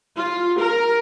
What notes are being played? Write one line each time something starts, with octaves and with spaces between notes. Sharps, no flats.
F4
A#4